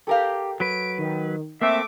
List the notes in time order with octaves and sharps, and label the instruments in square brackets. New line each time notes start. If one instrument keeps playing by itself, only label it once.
[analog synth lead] G4 [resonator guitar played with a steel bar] A4 A#4 F5
[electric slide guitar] F#3 B4 [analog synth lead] D7
[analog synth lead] D#3
[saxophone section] A3 E5 [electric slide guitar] A#3 C4 [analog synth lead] D6